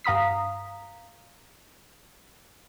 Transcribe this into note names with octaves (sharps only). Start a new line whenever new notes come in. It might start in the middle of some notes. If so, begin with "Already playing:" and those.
G2 F5 A#5 D#6 B6